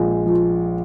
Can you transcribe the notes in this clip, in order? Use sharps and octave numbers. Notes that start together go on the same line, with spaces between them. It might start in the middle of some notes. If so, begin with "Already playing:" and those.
Already playing: A#1 G#3
F3